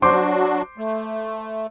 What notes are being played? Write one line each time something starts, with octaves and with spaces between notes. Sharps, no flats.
F#3 D4 F#4 C5 C6 D6
A3